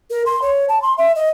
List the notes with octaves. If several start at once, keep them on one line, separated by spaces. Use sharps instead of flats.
A#4
C6
C#5
A5
C6
E5
D#5